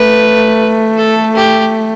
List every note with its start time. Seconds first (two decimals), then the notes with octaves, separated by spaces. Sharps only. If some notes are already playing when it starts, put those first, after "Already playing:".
Already playing: A3 B4
0.98 A4
1.35 G4